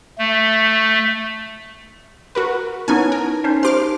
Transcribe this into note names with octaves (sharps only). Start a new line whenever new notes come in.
A3
F#4 A#4 B4
B3 C#4 D#4 E4 G#5
A#4
C#4 D#4 C5
G4 C5 C6 D6 F6